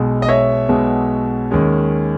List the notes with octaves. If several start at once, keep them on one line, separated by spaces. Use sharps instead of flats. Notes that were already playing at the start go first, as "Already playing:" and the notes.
Already playing: B1 B2 G#3
D#5
C#5 E5
B1 B2 G#3
D#2 D#3 G#3 C#4